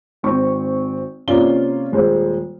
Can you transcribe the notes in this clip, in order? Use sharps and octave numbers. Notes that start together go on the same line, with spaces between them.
G#1 C4 C#6
C3 A#3 C#4 F4 D5 G7
D#1 G#3 C5